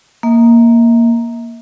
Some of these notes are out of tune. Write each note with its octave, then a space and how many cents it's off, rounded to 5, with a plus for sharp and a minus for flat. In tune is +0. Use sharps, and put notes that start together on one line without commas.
A#3 +0 E5 -35